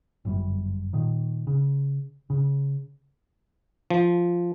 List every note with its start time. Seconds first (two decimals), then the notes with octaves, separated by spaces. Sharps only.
0.25 G1 F#2 G3
0.93 A#2 D#3
1.47 C#3
2.30 C#3
3.90 F3